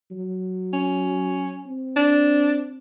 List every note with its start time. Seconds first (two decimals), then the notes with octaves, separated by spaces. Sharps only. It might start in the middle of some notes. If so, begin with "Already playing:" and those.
0.11 F#3
0.73 C#4
1.66 C4
1.96 D4